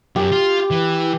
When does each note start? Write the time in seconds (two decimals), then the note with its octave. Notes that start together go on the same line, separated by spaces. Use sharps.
0.16 F#2 G4
0.32 F4
0.71 E3